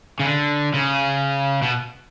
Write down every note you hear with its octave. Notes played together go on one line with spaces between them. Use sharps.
C#3
D3
C#3
B2